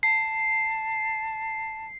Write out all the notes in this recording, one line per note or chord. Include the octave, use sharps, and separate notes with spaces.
A5 C7